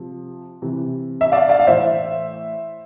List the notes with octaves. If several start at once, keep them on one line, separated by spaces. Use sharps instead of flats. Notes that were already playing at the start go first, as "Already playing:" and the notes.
Already playing: C3 F3
C3 E3
E5
D5 F5
D5 F5
F5
A2 E3 C5 E5